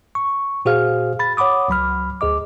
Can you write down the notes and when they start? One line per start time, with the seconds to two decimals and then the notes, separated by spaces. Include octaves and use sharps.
0.15 C#6
0.65 A#2 F#4 G#4 C5 F5 F6
1.19 B5 A6
1.37 C#5 F#5 B5 D6 D#6
1.68 C#2 F#3 B5 F6
2.21 D2 G#4 D#5 D6